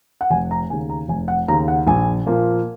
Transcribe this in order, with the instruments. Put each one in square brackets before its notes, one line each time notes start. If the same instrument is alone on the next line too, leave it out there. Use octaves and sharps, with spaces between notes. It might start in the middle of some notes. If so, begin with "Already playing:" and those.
[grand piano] F#5
F1 G#5
A#5
D#2 C#3 G#5
A#5
F1 G#5
F#5
D#2 A#5
C#3
F#5
A#1 G#5
A#2 F3 A#3